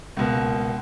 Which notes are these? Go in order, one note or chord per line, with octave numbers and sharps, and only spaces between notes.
C#2 B2 A#3